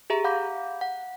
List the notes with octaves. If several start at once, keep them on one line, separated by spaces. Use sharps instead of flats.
G4 G#4 E5 A#5
F5 F#5 B5 D6 G6
F#5